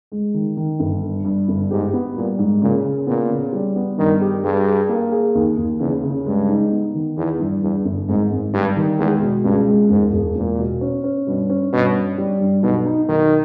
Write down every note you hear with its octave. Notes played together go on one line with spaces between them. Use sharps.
G#3
D#3
D#3
G1
G2
G2
G1
G#2 G4
B3
A#2 G3
G#2
A#2 C#3
C#3
A#2 B3
C#3
G3
B3
G2 D#3
G4
G2 G#4
G#4
A#3
G#4
D#2
D#2
E2 C#3
C#3
G2 G#3
D#4
B3
D#3
E2 E3
G2
E2 G2
G1
G#1 G#2
G#1
G2 G3
D#3
E2 G#3
B2
C#2 G2
G#3
E1 G#2
E1
E1 A#2
B2
C#4
C#4
G2 B2
C#4
G2 B2
C#4
G3
G2
B1 B2
D#4
B1 D#3